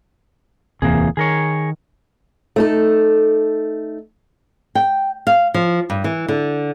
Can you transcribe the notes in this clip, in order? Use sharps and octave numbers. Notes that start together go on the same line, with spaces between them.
D1 E2 C3 E3 A#3 G#4
D#3 G#4 A#4 C#5
A3 D#4 A4
G5
F5
F3
G2
E3
D3